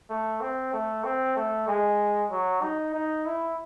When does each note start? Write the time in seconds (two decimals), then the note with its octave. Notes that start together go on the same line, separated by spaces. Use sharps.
0.10 A3
0.41 C4
0.73 A3
1.04 C4
1.36 A3
1.67 G#3
2.31 F#3
2.62 D#4
2.94 D#4
3.26 E4